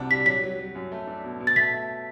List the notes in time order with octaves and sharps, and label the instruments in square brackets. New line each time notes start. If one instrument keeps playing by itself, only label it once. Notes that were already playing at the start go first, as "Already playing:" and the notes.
Already playing: [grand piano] C2 C3 D4 F#4
[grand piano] G3 [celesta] B6
[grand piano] F#3 [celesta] B6
[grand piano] F#3
F#3
F#2
A3
D4
B2
B2
[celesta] A6
[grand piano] A3 [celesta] B6
[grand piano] A3